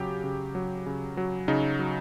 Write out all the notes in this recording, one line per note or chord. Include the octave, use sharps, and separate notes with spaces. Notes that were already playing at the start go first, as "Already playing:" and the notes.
Already playing: C#3 F#3 G4
C#3
F#3
C#3
F#3
C#3 D#4
F#3